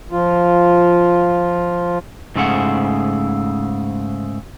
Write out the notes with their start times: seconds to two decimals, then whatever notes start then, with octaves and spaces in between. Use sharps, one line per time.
0.11 F3 F4
2.36 G#2 C#3 A3 C5 F#5